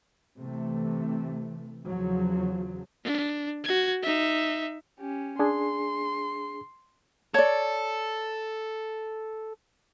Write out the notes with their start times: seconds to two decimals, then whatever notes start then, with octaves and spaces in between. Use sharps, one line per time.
0.40 C3 E3 A3
1.88 E2 C#3 F3 F#3
3.04 D4
3.64 F#4 G#6
4.03 D#4 E5
5.00 C#4 G4
5.39 D4 G#4 C6
7.34 A4 C#5 D5